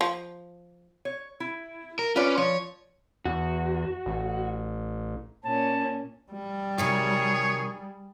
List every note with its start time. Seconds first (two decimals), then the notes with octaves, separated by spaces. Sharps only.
0.01 F3
1.05 C#5
1.40 E4
1.99 A#4
2.16 C#4 F4 B4 D5
2.37 F3 C#5
3.25 E2 F#4
4.06 A1
5.45 A#2 C#4 A5
6.32 G3
6.78 C3 D#3 F#3 G#4 C#5